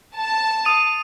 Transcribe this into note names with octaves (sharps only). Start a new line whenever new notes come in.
A5
D#6 D#7